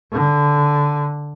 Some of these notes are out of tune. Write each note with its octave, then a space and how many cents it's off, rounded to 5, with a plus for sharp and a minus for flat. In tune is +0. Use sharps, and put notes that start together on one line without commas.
D3 -10